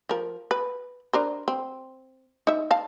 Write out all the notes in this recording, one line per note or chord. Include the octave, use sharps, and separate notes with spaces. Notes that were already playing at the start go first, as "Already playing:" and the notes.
F3 A#4
B4
D4 A#4 C5
C4
D#4 E5
F5 A5